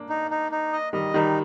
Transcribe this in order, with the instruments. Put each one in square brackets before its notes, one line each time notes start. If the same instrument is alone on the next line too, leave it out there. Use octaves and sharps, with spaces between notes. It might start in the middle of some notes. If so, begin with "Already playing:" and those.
Already playing: [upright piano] A#3 D4
[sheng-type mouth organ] D#4
D#4
D#4
D#5
[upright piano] D#3 G3 [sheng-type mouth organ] D#5
[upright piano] D#3 G3 [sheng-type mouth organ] D#4